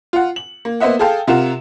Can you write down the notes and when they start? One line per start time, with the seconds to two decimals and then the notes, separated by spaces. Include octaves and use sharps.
0.13 F4 F#5
0.36 F#7
0.65 A#3
0.80 A#3 B3 C5 D#5 E5 F#5
0.99 G#4 A4 F5 G5 A5
1.27 C3 F4 A#4 F#5 E7